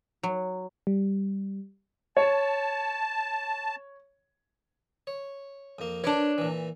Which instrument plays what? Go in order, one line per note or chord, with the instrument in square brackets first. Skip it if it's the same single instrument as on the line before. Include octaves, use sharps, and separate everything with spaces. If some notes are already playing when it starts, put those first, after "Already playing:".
[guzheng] F#3
[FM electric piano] G3
[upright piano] C#5 [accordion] A5
[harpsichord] C#5
F2 A#3
[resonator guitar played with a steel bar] D4 C#5 [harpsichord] A#4 B4 D6
[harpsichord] A#2 E3